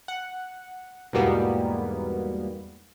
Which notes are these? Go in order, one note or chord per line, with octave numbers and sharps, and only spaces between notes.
F#5
E2 G#2 B2 G3 A#3 B3